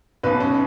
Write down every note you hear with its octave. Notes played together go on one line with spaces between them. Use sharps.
B1 B2 B4
C#4